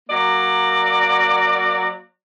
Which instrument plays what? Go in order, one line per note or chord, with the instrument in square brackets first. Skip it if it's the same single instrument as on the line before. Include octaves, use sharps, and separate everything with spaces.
[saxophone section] F#3 A#3 D5